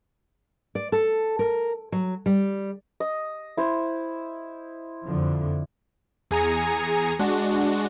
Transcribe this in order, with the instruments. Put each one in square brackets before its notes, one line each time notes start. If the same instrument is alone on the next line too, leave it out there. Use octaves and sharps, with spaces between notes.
[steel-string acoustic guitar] D5
A4
A#4
F#3
G3
[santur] D#5
E4 C5
[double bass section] F2 D3 F3
[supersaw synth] E2 G#4 G#5 A#5 C#7
G#3 D4 F#4